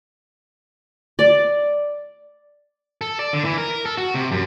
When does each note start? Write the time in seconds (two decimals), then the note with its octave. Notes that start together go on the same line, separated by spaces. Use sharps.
1.19 D5
3.01 A4
3.19 D5
3.33 D3
3.45 E3
3.58 A#4
3.86 A4
3.98 F#4
4.14 C3
4.32 F#2